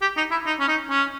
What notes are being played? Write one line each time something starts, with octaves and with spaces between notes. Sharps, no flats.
G4
D#4
E4
D#4
C#4
D#4
C#4